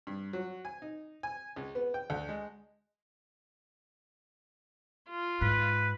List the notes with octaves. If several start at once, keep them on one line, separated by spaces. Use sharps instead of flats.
G2
F#3
G#5
D#4
G#5
C#2
B3
G5
D2
G#3
F4
G#2 B4